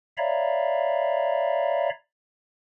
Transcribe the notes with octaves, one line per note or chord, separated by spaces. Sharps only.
C#5 D5 E5 F5 A#5 B5